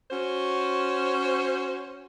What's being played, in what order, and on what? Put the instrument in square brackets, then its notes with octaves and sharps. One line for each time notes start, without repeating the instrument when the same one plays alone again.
[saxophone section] C#4 F#4 C5